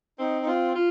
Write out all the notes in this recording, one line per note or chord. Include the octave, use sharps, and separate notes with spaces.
C4 D#4
D#4
C4 F4
F4